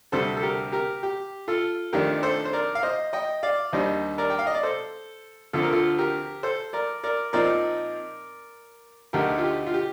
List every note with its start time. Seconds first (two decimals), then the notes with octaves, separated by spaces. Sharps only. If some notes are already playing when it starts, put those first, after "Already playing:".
0.12 D2 C3 G3 A4 C5
0.37 A4
0.43 G4 A#4
0.72 G4 A#4
1.03 G4
1.48 F4 A4
1.93 F2 D#3 A3 D4 G4 A#4
2.12 D5
2.23 A4 C5
2.45 C5
2.53 A#4 D5
2.75 F5
2.83 C5 D#5
3.13 D#5 G5
3.43 D5 F5
3.73 D#2 D#3 G3 D4 C5 D#5
4.18 A#4 D5
4.30 G5
4.39 F5
4.47 D#5
4.55 D5
4.63 A4 C5
5.53 D2 D3 F3 C4 A4
5.63 A#4
5.72 F4 A4
5.98 G4 A#4
6.43 A4 C5
6.73 A#4 D5
7.04 A#4 D5
7.33 A#2 F3 C4 D#4 A#4 D5
9.13 D2 D3 A3 D#4 G4 A#4
9.38 F4
9.44 G4
9.67 F4
9.74 G4